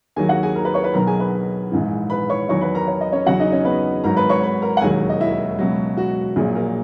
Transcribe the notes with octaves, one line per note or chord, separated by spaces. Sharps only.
D#2 D#3 F#3 G#4 G#5
F#4 F#5
G#4 G#5
A#4 A#5
B4 B5
C#5 C#6
B4 B5
B1 B2 F#3 A#4 A#5
G#4 G#5
B4 B5
A#1 G#2 E3
B4 B5
C#5 C#6
E2 D#3 F#3 C#5 C#6
B4 B5
A#4 A#5
C#5
D#5
C#4 C#5
E2 C#3 F#3 F#4 F#5
D#4 D#5
C#4 C#5
B3 B4
G#1 G#2 F#3 A#4 A#5
B4 B5
C#5 C#6
B4 B5
A#4 A#5
F#5
E1 D#2 D#3 F#3 G#4 G#5
D#5
E4 E5
C#2 B2 F#3
F#4
A#1 A#2 F#3 G#4
A#3 A#4